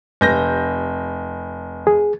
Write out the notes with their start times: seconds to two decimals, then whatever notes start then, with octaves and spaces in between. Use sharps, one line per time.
0.21 F1 G6 A#6
1.87 G#4